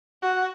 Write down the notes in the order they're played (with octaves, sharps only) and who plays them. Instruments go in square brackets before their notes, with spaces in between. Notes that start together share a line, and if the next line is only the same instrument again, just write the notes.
[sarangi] F#4